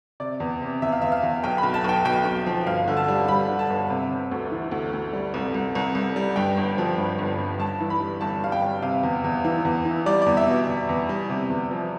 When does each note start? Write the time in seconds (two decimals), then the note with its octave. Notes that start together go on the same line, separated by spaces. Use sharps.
0.20 C3 D5
0.40 E2
0.62 C3
0.82 E2 E5
0.92 F5
1.02 E2 E5
1.12 F5
1.23 E2
1.44 B1 G5
1.58 B5
1.63 B1
1.74 A5
1.84 B1 G5
2.05 B1 G5
2.25 B1
2.46 F3
2.66 G1 F5
2.88 D3
2.97 A5
3.08 G3
3.28 G3 B5
3.48 D3
3.59 A5
3.70 G1
3.90 C3
4.10 C3
4.31 D2
4.51 E3
4.72 D2
4.93 D2
5.13 G3
5.34 C2
5.54 C2
5.75 C2
5.95 C2
6.16 G3
6.36 G2 G5
6.57 G1
6.78 F3
6.98 G2
7.19 G1
7.39 G2
7.59 G2 A5
7.80 E3
7.90 B5
8.00 G3
8.21 G1 A5
8.42 G3 F5
8.52 G5
8.62 G3
8.82 C3 F5
9.03 E2
9.24 E2
9.45 E3
9.65 E2
9.85 E3
10.06 G3 D5
10.22 E2 D5
10.37 E5
10.47 B2
10.67 E2
10.89 E2
11.09 G3
11.30 C3
11.50 E2
11.71 F3